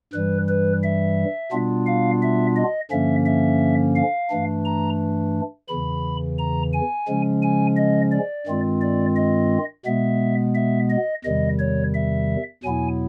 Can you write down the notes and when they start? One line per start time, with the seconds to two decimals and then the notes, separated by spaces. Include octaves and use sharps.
0.13 G2 E3 G3 B4
0.49 B4
0.83 E5
1.52 B2 G3 B3 D4 F4
1.87 F5
2.22 E5
2.56 D#5
2.91 G2 D3 F3 A#3 C#4 E5
3.26 E5
3.96 F5
4.30 G2 E3 A3 D4
4.65 A#5
5.69 E2 C#3 E3 B5
6.38 A#5
6.73 G#5
7.07 C#3 F3 G#3 C#4
7.42 G#5
7.77 D#5
8.12 D5
8.47 G2 D#3 G#3 C4 F4
8.82 D5
9.16 D#5
9.86 B2 G#3 B3 E5
10.55 E5
10.90 D#5
11.25 E2 C3 D#3 G3 D#5
11.60 C#5
11.94 E5
12.63 E2 B2 F#3 B3 E4 G#5